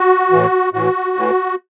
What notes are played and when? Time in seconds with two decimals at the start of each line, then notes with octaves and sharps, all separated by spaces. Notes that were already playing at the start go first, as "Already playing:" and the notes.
Already playing: F#4
0.32 A2 E3
0.73 A2 E3 F#4
1.17 A2 E3